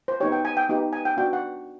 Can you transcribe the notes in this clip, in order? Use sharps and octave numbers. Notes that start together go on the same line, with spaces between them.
C5
B3 D#4 G4 C#5
G5
G#5
G5
B3 D#4 G4
G#5
G5
B3 D4 F#4 G5
F#5